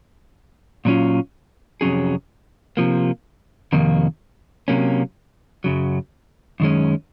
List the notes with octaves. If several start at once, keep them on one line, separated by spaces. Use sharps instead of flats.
A#2 F#3 C#4 F4
F2 C3 F#3 C#4 G#4
C3 F3 A#3
F2 C3 D#3 A#3
C3 F#3 A#3 C#4
F#2 C#3 F#3
F#2 D#3 G#3 C#4